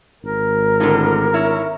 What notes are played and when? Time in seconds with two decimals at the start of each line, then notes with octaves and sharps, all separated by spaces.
0.24 G#1 A#4
0.80 A2 D3
1.34 E4 C#5